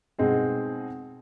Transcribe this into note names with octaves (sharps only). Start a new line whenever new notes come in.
B2 G#3 C4 D#4 G#4